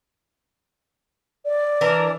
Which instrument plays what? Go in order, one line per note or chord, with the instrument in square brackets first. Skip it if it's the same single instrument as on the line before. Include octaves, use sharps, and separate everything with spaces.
[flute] D5
[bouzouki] E3 D4 A#4